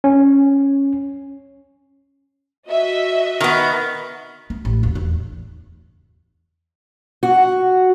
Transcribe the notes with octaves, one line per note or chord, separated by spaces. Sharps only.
C#4
F#4 D#5 E5
D#3 B3
B3
A1
D#1
E2
F#4